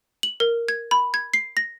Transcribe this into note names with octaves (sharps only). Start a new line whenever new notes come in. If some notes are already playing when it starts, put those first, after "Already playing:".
F#7
A#4
G#6
B5
G#6
C7
A#6